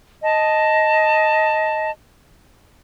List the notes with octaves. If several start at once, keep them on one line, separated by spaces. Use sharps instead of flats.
D#5 A5